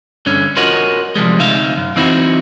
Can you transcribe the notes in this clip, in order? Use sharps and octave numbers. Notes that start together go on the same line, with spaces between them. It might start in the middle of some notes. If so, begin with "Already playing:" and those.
G2 D3 C#4
F4 F#4 A#4 C#5 D#5 F#5
C3 F3 G3 G#3
D2 C3 D#4 E5 F5
F#2
E3 C4 D#4 E4 F#4